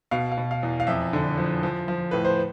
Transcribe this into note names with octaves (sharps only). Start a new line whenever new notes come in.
B2 F5
F5
B2
F5
E2
F5
F2 E5
D3
F3
F3
F3
A2 B4
C5